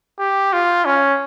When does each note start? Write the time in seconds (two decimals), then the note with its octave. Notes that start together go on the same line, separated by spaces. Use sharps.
0.19 G4
0.53 F4
0.85 C#4